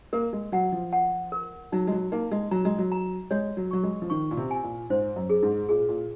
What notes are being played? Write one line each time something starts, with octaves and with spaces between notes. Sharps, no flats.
A#3 A#4
G#3
F#3 F#5
F3
F#5
A#4
F#3 D#4
G#3
F#3
A#3 D#4
G#3
F#3 A#5
G#3
F#3
A#5
G#3 C#5
F#3
F#3 C#6
G#3
F3
D#3 C#6
A#2
C3
G#5
A#2
G#2 C5
F#2
G#4
G#2
A#2 G#4
A#2